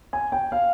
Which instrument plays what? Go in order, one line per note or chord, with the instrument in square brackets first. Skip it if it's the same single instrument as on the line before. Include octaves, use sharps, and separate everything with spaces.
[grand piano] G#5
G5
F5